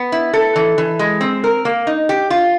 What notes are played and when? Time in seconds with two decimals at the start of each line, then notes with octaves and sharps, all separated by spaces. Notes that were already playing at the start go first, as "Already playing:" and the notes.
Already playing: B3
0.12 E4
0.33 A4
0.56 E3
0.78 E3
0.99 G#3
1.21 C4
1.44 A#4
1.65 A#3
1.87 D#4
2.09 G4
2.30 F4